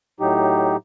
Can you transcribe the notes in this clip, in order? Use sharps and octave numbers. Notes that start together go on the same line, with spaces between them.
A2 F#3 D#4 G4